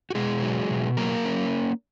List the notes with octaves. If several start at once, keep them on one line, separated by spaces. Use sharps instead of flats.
F#4
B2 G#3 G#4
F#3
B2
F#3 A#3 A#4
C#4